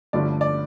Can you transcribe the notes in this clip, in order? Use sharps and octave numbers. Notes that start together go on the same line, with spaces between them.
G1 G2 D3 F3 A3 D5
D5